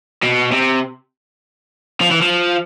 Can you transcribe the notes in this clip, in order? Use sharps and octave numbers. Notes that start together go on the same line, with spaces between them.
B2
C3
F3
E3
F3